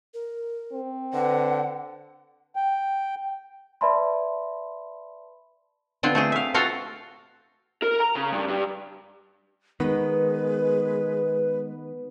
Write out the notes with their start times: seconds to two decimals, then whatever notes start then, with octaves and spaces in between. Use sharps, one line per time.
0.14 A#4
0.72 C4
1.13 D3 B4 F#5
2.56 G5
3.81 B4 D5 E5 A5 B5 C6
6.03 D3 B3 C4 F4
6.15 A3 C4 G#4
6.32 E5 F5
6.54 C4 F4 F#4 A4 F5
7.82 A#4
8.00 A#5
8.15 C#3
8.32 G2
8.48 G2
9.80 D#3 G#3 B3 B4